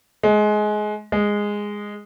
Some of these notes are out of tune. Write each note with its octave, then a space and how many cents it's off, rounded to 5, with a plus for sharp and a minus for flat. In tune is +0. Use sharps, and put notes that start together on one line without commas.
G#3 +20
G#3 -10